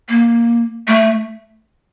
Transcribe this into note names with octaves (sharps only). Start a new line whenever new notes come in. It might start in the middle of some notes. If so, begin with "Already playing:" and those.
A#3
A3